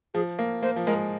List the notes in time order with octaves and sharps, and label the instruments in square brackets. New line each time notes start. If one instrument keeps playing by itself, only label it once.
[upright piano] F3 [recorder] G#4
[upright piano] A#3
[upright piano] A#3 [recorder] C5
[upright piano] F3
[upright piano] G#3 [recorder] A#4